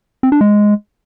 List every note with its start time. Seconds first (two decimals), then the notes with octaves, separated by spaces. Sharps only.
0.23 C4
0.32 D4
0.41 G#3